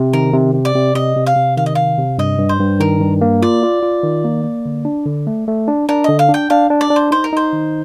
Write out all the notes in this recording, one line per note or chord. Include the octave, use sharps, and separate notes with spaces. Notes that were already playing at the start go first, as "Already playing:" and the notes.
Already playing: C3
D#3 A#4
C3
C3
D5
C3
C3 D#5
C3
F5
C3
D#3 F5
D#5
C3 F5
C3
G2 D#5
G2
C5
G2
D#3 A#4
G2
A#3
F4 D5
F4
F4
D#3
A#3
A#3
D3
D4
D3
A3
A3
D4
D4 A#4
D3 D#5
F5
D4 G5
D4 F5
D4
D5
D4
C5
D#4 C5
A#4
D#4 C5
D#3